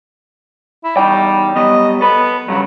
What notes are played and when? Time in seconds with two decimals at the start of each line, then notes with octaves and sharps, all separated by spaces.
0.84 E4
0.97 E2 G3 D#4 G5
1.56 F#3 G3 B3 D#5
2.01 B3 A4 B4
2.48 G2 A#2 C#3 F#3